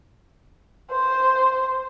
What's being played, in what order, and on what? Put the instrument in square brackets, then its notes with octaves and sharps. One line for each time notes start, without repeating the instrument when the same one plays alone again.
[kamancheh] C5